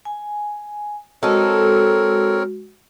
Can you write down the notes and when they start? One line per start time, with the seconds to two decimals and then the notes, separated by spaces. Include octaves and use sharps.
0.05 G#5
1.23 G#3 C4 D#4 F#4 A4 A#4 C#5